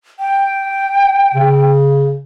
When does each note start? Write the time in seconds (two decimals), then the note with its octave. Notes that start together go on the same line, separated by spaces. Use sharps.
0.19 G5
1.34 C#3